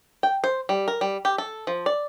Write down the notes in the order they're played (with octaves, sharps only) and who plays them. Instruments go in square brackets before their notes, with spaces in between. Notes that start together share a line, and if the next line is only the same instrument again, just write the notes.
[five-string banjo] G5
C5
G3
A#4
G3
G4
A4
F3
D5